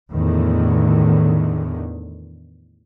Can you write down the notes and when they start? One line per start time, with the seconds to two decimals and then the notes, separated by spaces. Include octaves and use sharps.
0.12 E2 A2 D3 D#3